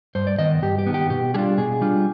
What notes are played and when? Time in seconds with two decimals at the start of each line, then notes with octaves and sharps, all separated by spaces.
0.15 G2 C5
0.27 D5
0.39 D#3 B3 D#5
0.63 G2 G4
0.79 G4
0.86 D#3 B3
0.94 G4
1.10 B2 G4
1.34 G3 D4 F4 G#4
1.58 B2 G#4
1.81 G3 D4 F4